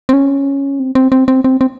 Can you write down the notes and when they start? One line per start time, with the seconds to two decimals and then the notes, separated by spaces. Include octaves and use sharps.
0.09 C4
0.13 C#4
0.80 C4
0.95 C4
1.12 C4
1.28 C4
1.44 C4
1.61 C4